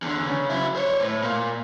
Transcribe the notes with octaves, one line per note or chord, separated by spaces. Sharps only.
E2 D3
C#3
F#3 E4
C5 C#5
A2
A#2 A#3